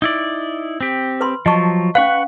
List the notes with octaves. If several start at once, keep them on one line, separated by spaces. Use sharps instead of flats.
D#4 E4 D5
C4 G4
B4 B5 C6
F3 F#3 D#5 A5 C#6
C#4 B4 F5 F#5 C#6